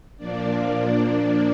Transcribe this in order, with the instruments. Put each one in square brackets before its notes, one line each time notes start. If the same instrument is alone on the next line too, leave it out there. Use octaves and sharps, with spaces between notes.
[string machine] A#2 F3 A#3 D4 D5